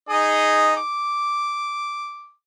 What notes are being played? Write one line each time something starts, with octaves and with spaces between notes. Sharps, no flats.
D#4 G#4 D#5
D6